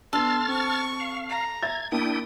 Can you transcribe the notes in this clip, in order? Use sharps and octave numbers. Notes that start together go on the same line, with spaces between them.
B3 D4 A4 C6 F6 A6
C4 C#6
F5
A#5
E5 G#6 A6
A#3 D4 E4 G5 D#6